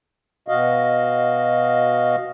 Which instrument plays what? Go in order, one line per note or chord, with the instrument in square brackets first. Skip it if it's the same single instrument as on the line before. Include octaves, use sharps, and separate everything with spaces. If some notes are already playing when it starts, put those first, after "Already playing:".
[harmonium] B2 F#4 D#5 F5